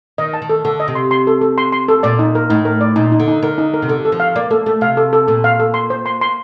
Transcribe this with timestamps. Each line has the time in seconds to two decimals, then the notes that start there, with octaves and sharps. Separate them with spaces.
0.18 D#3 D#5
0.34 A5
0.42 D#3
0.50 A4
0.65 D3 A4
0.80 D#5
0.88 C3
0.95 C6
1.11 C6
1.27 A4
1.41 A4
1.58 C6
1.72 C6
1.88 A4
2.03 A#2 D5
2.19 D#4
2.35 A#4
2.50 A2 D#4
2.65 A#4
2.81 D5
2.96 A#2 D#4
3.12 D#4
3.20 D3
3.28 D#4
3.43 D3 A#4
3.58 D#4
3.74 A#4
3.82 C3
3.88 D3 A4
4.05 A4
4.12 F3
4.20 F5
4.36 A#3 D5
4.50 A#3 A4
4.66 A3 A4
4.81 C3 F5
4.97 A4
5.13 A4
5.28 A#2 A4
5.44 F5
5.60 A4
5.74 C6
5.90 C5
6.06 C6
6.21 C6